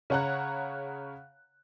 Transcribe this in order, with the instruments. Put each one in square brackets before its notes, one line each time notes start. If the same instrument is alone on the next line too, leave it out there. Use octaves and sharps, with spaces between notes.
[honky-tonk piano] C#3 C#5 F#5 A#5 F#6